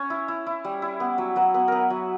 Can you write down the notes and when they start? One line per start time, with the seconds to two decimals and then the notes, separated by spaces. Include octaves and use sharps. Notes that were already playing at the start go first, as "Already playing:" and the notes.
Already playing: C#4 C#5
0.10 E4
0.28 E4
0.46 E4
0.64 G3
0.82 E4
1.00 B3
1.18 F#3
1.36 F#3 B4
1.54 B3 B4
1.68 B3 A#4 B4
1.90 F#3